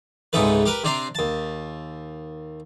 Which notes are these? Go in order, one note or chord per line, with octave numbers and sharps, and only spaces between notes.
C#2 G#2 C3 D#4 A4 B4
G4 A#4 B4
C3 C4 D4 A#5 C6
D#2 A5